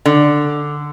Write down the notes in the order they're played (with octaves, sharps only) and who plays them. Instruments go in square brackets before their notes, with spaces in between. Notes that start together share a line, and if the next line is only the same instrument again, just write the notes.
[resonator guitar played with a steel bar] D3